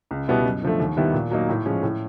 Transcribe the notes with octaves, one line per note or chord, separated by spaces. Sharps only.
C#2
B2 G3 B3 E4
F#2
D3 F3 A3
D#2
D#3 G3 B3 E4
A#2
F#3 A#3 D#4
A2
F3 G#3 C#4
A2